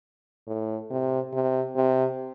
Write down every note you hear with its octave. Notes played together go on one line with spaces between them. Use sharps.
A2
C3
C3
C3